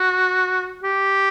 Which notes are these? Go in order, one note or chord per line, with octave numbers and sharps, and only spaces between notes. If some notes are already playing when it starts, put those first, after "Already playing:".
Already playing: F#4
G4